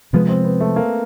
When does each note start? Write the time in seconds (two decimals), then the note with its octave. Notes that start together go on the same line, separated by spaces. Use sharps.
0.13 C3 F3 G#3 B3
0.29 C4
0.44 B3
0.60 A3
0.76 A#3